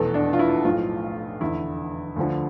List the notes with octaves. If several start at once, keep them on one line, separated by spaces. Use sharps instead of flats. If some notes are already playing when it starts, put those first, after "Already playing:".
Already playing: F1 E2 B2 A4
D4
F4
E4
B1 A2 F3 F4
F1 E2 D3 E4
D2 D3 F3